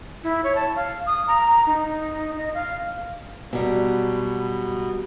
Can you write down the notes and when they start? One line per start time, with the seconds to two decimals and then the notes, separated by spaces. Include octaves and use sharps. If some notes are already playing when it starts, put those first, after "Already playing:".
0.24 E4
0.44 C#5
0.55 A5
0.76 F5
1.06 D#6
1.27 A#5
1.67 D#4
2.38 D#5
2.54 F5
3.53 B2 F#3 G3